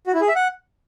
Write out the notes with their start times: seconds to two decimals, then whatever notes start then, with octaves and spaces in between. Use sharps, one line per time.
0.07 F#4
0.14 E4
0.21 G#4
0.28 E5
0.35 F#5